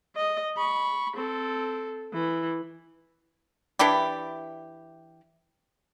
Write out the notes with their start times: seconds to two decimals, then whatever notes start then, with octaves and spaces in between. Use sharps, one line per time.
0.15 D#5
0.57 B5 C#6
1.16 C4 A4
2.13 E3
3.79 E3 D4 E4 G4